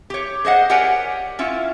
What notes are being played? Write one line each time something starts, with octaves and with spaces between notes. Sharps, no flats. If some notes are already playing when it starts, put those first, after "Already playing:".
G4 C#5
G#4 C5 D#5 F#5
G4 A#4 C#5 D5 F#5 G#5
C#4 E4 F4